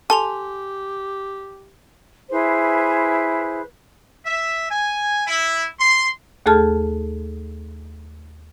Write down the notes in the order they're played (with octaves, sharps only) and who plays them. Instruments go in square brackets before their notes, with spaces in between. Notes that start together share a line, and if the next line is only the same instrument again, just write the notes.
[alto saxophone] G4 [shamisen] A4 [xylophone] G#5 C6 F7
[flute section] E4 G#4 B4 C5
[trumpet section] E5
G#5
E4
C6
[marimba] D#2 A3 G#4 A4 A5 F6